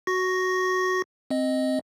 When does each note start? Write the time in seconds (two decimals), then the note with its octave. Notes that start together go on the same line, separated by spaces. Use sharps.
0.07 F#4 C#6 A#6
1.30 C4 D#5